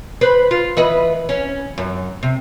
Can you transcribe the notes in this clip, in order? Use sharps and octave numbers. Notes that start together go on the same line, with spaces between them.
B4 C5
F4
E3 B4 D#5
C#4
F#2
C3